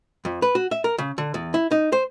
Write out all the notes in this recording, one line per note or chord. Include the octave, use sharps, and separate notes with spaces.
F2
B4
F#4
E5
A#4
C#3
D3
E2
E4
D#4
C5